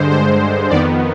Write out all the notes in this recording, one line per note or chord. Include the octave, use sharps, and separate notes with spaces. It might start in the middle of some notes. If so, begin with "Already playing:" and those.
Already playing: G2 D3 G#3 C5
C5
F2 D#3 B3 D5